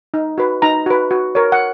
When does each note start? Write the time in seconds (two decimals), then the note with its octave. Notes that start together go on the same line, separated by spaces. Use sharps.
0.14 D#4
0.38 F#4 B4
0.62 D#4 A#5
0.86 F#4 B4
1.11 F#4
1.35 A#4 C#5
1.52 F#5